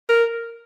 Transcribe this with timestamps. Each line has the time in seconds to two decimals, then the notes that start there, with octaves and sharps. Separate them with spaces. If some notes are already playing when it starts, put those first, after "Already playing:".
0.09 A#4